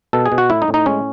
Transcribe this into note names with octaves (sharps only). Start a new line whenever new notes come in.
B2 A4
G#4
B2
F#4
A2 E4
D#4
A2
D#4
G#3 C#4